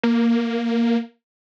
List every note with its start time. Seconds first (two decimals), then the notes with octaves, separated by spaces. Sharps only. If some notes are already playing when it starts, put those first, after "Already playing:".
0.03 A#3